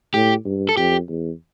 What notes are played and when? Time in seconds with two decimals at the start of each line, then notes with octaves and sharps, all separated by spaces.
0.14 A2 G4
0.45 G2
0.69 A4
0.77 F2 G4
1.08 E2